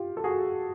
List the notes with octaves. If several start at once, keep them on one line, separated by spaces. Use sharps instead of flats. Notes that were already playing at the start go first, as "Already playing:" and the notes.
Already playing: F4 G4
A4
F#4 G#4